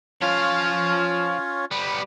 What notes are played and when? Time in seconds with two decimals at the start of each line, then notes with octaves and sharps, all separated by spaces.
0.21 F3 C#4 F4 C#5 F5
1.71 G3 B3